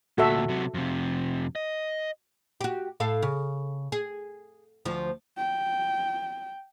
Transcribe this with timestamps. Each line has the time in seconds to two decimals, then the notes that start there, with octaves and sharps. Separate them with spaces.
0.18 D2 A#2 F#4 A4 E5
0.49 C3 F#3
0.74 F2 C3
1.56 D#5
2.61 F#4 G4
3.00 A2 A4 F5
3.22 C#3
3.92 G#4
4.85 D2 F3
5.38 G5